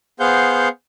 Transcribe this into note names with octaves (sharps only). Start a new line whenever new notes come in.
B3 G#4 C5 F5 F#5 G6